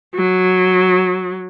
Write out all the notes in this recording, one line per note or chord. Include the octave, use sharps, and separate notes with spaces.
F#3